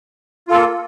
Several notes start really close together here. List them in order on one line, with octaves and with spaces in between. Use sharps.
F4 A4 A#3